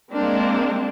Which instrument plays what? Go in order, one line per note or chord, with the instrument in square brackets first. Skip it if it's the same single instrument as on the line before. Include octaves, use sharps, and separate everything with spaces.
[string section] G#3 A#3 C4 D4